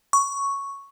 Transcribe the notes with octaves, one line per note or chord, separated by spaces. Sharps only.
C#6